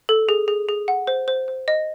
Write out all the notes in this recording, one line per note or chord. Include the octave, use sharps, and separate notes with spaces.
A4
G#4
G#4
G#4
F#5
C5
C5
C5
D#5